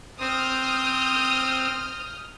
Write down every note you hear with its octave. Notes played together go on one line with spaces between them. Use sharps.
C4 D#6 F6 G6